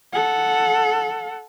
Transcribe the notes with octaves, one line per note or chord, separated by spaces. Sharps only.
A4 F#5